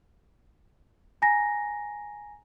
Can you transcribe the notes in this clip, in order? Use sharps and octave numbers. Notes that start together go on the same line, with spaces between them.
G#5 A#5 A#6